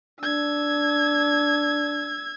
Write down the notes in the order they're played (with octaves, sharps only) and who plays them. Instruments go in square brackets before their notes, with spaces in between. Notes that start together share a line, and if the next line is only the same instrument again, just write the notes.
[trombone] D4 [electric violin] E6 G#6